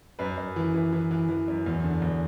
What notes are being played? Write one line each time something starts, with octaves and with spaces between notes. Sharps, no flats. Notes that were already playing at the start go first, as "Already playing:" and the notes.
F#2 B4
F#2
E3
E3
E3
E3
E3
F#2
E2
D3
E2